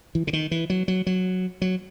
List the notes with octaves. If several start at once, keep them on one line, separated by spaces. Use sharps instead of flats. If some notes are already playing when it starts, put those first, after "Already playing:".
E3
C#3
D#3
E3
F#3
F#3
F#3
F#3